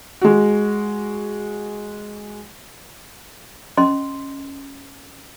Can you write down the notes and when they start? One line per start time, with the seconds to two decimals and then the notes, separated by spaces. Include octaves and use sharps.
0.21 G#3 F#4
3.77 C#4 D#5 C6